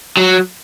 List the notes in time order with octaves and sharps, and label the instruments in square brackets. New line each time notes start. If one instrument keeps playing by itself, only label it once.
[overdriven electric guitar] F#3